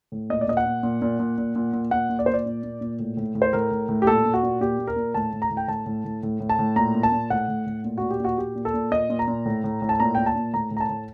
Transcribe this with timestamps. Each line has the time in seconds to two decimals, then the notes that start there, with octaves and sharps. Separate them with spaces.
0.12 A2
0.30 A#2 D#5
0.41 D5
0.48 A#2 D#5
0.57 F#5
0.66 A#2
0.83 A#2
1.02 A#2
1.19 A#2
1.38 A#2
1.56 A#2
1.73 A#2
1.91 A#2 F#5
2.09 A#2
2.19 D5
2.26 A#2 C5
2.34 D5
2.46 A#2
2.64 A#2
2.81 A#2
2.99 A2
3.17 A2
3.35 A2
3.42 C5
3.53 A2 A#4
3.71 A2
3.89 A2
4.02 G4
4.06 A#2 A4
4.25 A#2
4.34 F#4
4.43 A#2
4.60 A#2 G4
4.79 A#2
4.87 A#4
4.96 A#2
5.14 A2 A5
5.33 A2
5.42 A#5
5.50 A2
5.57 G5
5.68 A2 A5
5.86 A2
6.05 A2
6.23 A2
6.40 A2
6.49 A5
6.59 A2
6.76 A#2 A#5
6.95 A#2
7.03 A5
7.12 A#2
7.30 A2 F#5
7.48 A2
7.66 A2
7.84 A#2
7.98 A#2 F#4
8.11 G4
8.20 A#2 F#4
8.38 A#2 G4
8.55 A#2
8.65 A4
8.74 A#2
8.91 A#2 D#5
9.10 A#2
9.19 A#5
9.28 A#2
9.46 A2
9.64 A2
9.82 A2
9.89 A5
10.00 A#2 A#5
10.15 A#2 G5
10.26 A5
10.36 A#2
10.53 A2 A#5
10.71 A2
10.77 A#5
10.80 A5
10.89 A2